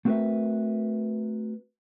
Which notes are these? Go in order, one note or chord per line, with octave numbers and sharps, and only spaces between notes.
A3 C4 F#4 A#4 B4 E5